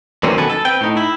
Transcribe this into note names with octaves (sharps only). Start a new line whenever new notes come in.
F#2 D3 E3 A#3 C4 C#4
B2 D#3 A4 B4 G#5
A4
C4 B4 G5
A2 D#4
E4